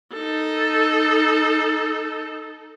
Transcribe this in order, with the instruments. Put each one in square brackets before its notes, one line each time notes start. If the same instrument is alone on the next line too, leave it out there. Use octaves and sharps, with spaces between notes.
[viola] D#4 A4